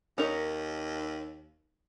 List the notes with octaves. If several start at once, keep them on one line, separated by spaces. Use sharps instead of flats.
D#2 C#4 D#4 A#4